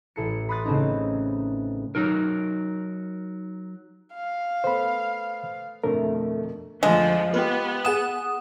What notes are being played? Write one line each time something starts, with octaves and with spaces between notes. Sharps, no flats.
A1 E4 A4 C7 C#7
B5 C6 D#6 F#6 A6
C#3 A3 C4 C#4 D#4
F#3 D#4 A#4
F5
A3 B3 C5 B5
F2 B2 D3 A3 A#4
F2 D3 F3 G#3
B3 F4 G4 B4
G#4 F#5 D#6 E7